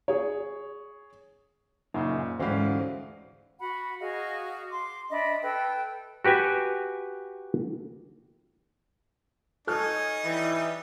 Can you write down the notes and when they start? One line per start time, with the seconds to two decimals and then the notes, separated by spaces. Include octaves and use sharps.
0.08 G#4 C#5
1.94 F#2 A#2 C#3 D#4 C5
2.40 D2 G#2 E3 C#4 F#4 G4 C5 F5
3.60 F#4 F#5 B5
3.99 F#4 G#4 D#5 F5
4.69 C6 D6
5.10 D4 D#5 E5 B5
5.42 A4 B4 G5
6.25 F#4 G4 B4 G#5
9.67 D#4 A4 C#5 G#5 D#6 F6
10.24 E3 G3